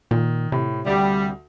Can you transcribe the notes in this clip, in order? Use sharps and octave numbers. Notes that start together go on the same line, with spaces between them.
A#2 D#3
A2 C3
D2 G3